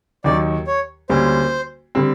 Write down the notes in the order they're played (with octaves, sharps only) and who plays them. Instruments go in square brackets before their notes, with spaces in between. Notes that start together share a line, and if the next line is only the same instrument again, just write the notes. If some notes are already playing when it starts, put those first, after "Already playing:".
[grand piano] D#2 D#3 F#3 [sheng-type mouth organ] D5
[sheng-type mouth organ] C#5
[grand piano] D2 D3 G3 A#3 C#4 [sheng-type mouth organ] C5
[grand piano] D3 G3 C4